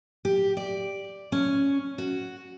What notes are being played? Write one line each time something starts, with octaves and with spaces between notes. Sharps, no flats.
G4
D5
C#4
F#4